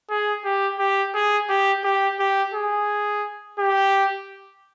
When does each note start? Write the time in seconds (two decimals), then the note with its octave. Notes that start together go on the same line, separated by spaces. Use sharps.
0.10 G#4
0.45 G4
0.79 G4
1.14 G#4
1.49 G4
1.84 G4
2.19 G4
2.54 G#4
3.59 G4